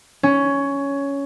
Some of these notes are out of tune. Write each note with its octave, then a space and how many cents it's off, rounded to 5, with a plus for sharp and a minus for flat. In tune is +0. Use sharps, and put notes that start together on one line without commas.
C#4 +10